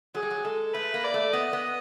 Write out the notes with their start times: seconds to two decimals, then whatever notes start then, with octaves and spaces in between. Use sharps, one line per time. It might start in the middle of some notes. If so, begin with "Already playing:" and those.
0.15 F#3 G#4
0.23 G3
0.30 F#3
0.44 G#3 A4
0.74 A3 B4
0.94 A#3
1.04 D5
1.14 A3
1.33 B3 D#5
1.53 B3